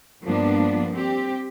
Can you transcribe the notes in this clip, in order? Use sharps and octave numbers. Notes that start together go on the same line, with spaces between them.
G2 F3 A#3 B3 D4
C4 G4